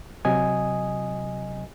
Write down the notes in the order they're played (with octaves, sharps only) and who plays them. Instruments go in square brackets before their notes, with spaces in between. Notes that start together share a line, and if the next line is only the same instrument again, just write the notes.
[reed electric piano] C3 F#3 D#5 G#5 D#6